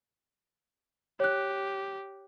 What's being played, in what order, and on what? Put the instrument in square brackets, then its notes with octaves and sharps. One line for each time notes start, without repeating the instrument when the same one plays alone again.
[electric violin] G4 [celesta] C#5 F#6